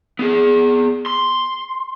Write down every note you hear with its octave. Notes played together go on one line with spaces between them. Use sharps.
B3 G#4
C6